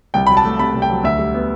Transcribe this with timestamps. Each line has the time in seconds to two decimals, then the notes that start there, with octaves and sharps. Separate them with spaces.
0.14 C2 G5
0.27 F#3 B5
0.37 A5
0.44 A3
0.59 C3 B5
0.74 C2
0.82 G5
0.90 F#3
1.04 D2 E5
1.19 G3
1.34 B3